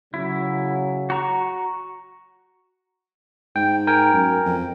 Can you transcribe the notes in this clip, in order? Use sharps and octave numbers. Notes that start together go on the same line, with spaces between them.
C#3 F#3 E4
F#4 A#5 C#6
G#2 G5
A#4 G5 G#5
F#2
F2